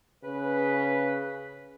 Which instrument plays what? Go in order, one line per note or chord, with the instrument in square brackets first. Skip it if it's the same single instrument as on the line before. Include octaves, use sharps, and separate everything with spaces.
[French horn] C#3 [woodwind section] B4